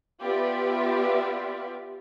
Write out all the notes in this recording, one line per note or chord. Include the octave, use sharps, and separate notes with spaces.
B3 F4 G4 D5 E5